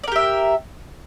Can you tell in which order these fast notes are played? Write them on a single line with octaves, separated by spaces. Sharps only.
D5 A#4 G4 E5